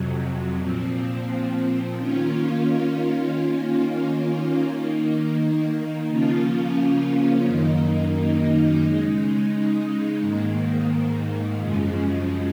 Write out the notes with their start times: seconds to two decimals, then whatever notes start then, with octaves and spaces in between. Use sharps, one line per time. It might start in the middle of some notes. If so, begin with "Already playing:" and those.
Already playing: F2 C3 F#3
0.58 A#2 F3 C4
1.96 D#3 A#3 C#4 F4
3.33 D#3 A#3 C#4 F4
4.71 D#3 A#3 D#4
6.08 C#3 F3 A#3 C#4 F4
7.46 F#2 D#3 A#3 D#4
8.82 C#3 G#3 D#4
10.20 G#2 D#3 A#3
11.57 F#2 C#3 F3 G#3